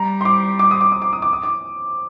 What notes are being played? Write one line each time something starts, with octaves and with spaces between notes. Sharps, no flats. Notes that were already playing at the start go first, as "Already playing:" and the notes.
Already playing: G3 A#5
C6
D6
D6
D#6
D6
D#6
D6
D#6
D6
D#6
D6